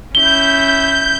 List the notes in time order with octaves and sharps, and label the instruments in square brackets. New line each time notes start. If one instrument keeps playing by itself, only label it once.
[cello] C#4 E4 [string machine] G6 [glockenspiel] G7